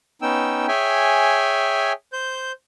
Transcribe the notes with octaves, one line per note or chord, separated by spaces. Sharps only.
B3 C#4 D#4 G5 E6
G#4 C#5 E5 G5 G#5
C5 G6